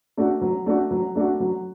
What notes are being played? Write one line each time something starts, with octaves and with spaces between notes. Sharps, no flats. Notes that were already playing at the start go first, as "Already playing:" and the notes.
A3 D4 F#4
F#3
A3 D4 F#4
F#3
A3 D4 F#4
F#3